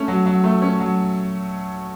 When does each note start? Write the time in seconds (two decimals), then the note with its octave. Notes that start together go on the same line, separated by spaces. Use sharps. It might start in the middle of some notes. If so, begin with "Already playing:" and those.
Already playing: A3 C#4
0.08 F#3
0.26 F#3
0.44 A3
0.62 C#4
0.80 F#3